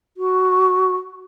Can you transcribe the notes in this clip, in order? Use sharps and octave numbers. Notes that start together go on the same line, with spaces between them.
F#4